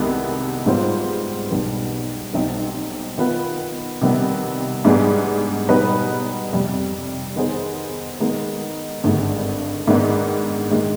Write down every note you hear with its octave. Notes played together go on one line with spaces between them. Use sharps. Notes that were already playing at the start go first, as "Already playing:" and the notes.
Already playing: C2 C3 D#3 G#3 B3
G#2 G3 B3 F4 C5
B1 B2 G3 B3
B1 B2 G3 C4 D#4
D#3 B3 F4 B4
C3 D#3 G3 B3
G#2 G3 B3 D4 G#4
B2 G3 B3 D#4 B4
F2 C3 G3
D#3 B3 D#4 G#4 C5
D#3 G#3 B3 D#4
G#1 G2 D3 G#3
G#2 D#3 B3 D4
D#3 G#3